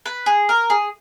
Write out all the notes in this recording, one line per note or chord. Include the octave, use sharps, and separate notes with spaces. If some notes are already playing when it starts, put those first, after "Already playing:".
B4
G#4
A#4
G#4